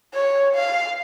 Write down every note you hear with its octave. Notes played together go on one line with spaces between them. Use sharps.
C#5
F5